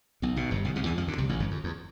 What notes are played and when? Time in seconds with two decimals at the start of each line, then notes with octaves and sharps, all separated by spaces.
0.22 B1 B2
0.36 B1 B2
0.50 G1 G2
0.65 B1 B2
0.76 C2 C3
0.86 E2 E3
0.98 F2 F3
1.07 D2 D3
1.18 C2 C3
1.29 A1 A2
1.40 G1 G2
1.51 F2
1.64 E2